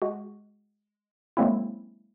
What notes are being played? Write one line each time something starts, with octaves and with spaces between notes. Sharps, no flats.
G#3 F#4
F#3 G#3 A#3 C4 C#4 E4